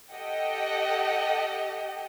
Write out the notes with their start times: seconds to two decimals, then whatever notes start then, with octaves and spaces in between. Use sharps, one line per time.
0.12 G4 A4 D#5 F#5 G5